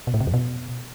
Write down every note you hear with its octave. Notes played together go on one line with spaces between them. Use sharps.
B2
A2
C3
F2
B2